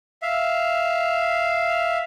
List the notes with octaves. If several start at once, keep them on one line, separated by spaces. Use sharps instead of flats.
E5 F5